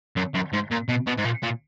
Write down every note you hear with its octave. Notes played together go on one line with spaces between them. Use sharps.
F#2
F#2
G#2
A#2
B2
B2
G#2
A#2
A#2